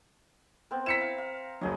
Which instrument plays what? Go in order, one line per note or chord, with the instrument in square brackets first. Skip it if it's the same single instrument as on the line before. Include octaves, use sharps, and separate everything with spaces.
[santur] B3 C4 A#4
[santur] E4 A#5 [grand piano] B6 C#7 E7
[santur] F5
F5
[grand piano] F#1 F#3 [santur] G#4 D#5